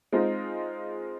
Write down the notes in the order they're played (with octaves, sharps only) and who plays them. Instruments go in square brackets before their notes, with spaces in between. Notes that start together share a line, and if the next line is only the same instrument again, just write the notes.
[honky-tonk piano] G#3 C4 D#4 F4